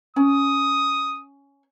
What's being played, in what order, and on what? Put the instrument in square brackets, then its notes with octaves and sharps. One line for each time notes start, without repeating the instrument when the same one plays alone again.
[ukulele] C#4 [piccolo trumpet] D#6